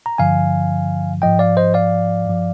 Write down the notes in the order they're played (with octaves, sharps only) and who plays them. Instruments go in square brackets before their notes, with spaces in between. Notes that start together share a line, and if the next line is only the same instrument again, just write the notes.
[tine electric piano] A#5
G2 D3 F3 F5 G#5
G#2 F3 D#5 G5
D5 F5
C5 D#5
D5 F5
G2 F3